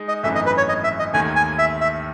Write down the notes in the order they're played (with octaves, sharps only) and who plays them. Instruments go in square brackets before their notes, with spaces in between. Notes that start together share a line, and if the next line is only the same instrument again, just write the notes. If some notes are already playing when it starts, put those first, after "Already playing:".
Already playing: [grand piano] G#3 D#4
[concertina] D#5
[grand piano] G#1 F#2 E3 A3 D#4 [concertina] E5
[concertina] D#5
B4
C#5
D#5
E5
D#5
[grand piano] D#2 D#3 A3 [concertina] G#5
[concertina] G#5
E5
E5